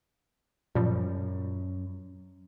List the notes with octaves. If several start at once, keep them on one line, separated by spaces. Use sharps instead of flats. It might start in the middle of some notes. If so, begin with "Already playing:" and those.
F#2 A#2 F3 G3